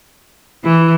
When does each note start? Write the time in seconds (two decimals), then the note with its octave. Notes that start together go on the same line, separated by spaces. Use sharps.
0.64 E3 E4